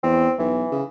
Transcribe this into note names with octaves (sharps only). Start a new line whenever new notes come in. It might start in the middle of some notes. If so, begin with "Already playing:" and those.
E2 C4
B1 E3
C#3